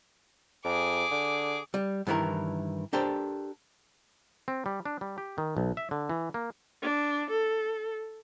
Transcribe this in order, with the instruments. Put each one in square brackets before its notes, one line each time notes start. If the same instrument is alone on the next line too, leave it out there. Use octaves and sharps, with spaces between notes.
[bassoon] F2 [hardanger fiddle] G#4 D6
[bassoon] D3
[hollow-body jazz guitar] G3
G2 D#3 E3 E4 A#4
D4 G4 A4 A#4 C5
[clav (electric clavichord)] C4
G3
D4
G3
G4
D#3
B1
E5
D3
E3
A#3
[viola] D4
A4